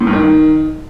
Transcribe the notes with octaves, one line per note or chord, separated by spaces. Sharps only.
A2
G2
D#3